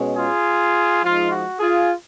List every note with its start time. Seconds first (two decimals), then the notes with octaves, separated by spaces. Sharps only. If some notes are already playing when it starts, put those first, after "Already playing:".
Already playing: B2 G#3 C#4
0.14 F4 G#4
1.02 F3 G#3 D#4 F4
1.31 F#4
1.59 F4 G#4